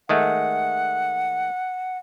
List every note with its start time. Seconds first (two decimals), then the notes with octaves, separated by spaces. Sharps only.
0.09 D#3 G#3 A3 F#5